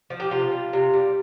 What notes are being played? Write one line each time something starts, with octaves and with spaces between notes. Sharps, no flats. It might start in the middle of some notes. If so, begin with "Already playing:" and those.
F3
G4
C3 F4
G3
C3
G3